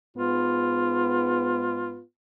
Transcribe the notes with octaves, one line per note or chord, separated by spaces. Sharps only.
G#2 B3 F4